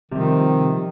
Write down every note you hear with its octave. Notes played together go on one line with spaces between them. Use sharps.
C3 D#3 F3 G3